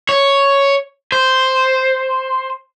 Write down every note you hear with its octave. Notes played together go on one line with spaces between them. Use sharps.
C#5
C5